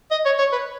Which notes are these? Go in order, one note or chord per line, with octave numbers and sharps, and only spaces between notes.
D#5
C#5
C#5
B4